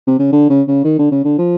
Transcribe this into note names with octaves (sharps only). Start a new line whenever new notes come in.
C3
C#3
D3
C#3
C#3
D#3
D3
C#3
D3
F3